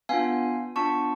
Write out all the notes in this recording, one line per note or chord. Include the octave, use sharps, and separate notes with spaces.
B3 D4 F4 F5 G#5
B3 D4 F4 A5 C#6